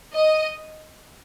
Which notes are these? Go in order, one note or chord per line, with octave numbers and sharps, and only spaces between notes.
D#5